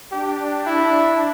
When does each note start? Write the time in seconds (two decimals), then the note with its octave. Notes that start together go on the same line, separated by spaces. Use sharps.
0.12 D4 G4
0.66 D4 E4